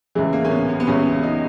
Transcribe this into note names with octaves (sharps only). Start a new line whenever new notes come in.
C#2 C#3 E3 G#3
A#3
C#4
B3
B3
B3
C#2 C#3 E3 C#4
D#4